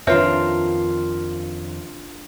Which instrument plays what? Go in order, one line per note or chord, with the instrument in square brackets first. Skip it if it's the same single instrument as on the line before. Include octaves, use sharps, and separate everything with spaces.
[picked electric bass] F2 D#3 [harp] D4 F4 A#4 [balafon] B4 C#5 E5